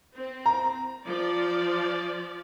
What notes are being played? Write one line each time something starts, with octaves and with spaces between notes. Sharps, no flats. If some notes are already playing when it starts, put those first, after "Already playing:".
C4
A#5
F3 D5